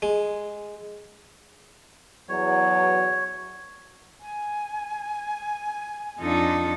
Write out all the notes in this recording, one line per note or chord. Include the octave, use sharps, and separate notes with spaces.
G#3
E2 F#3 C#5
G#5
F2 D4 D#4 F4 A4